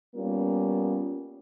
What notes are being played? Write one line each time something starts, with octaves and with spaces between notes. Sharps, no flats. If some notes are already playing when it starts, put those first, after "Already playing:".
G3 A#3 B3 C#4 F4